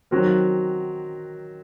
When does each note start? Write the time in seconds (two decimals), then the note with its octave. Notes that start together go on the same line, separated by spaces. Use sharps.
0.11 D#3 F#3 C4 F#4 A#4